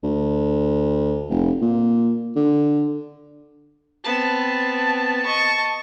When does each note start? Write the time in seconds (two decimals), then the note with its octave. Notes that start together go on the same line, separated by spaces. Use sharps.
0.04 D2
1.30 F1
1.62 A#2
2.36 D3
4.04 B3 C4 A5
5.26 D#5 C#6